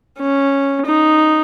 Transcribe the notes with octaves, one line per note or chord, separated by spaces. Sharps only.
C#4
D#4